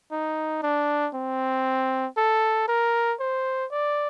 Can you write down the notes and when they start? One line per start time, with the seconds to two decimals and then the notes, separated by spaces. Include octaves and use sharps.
0.12 D#4
0.63 D4
1.15 C4
2.17 A4
2.68 A#4
3.20 C5
3.71 D5